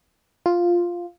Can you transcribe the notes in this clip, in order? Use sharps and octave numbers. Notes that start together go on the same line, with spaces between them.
F4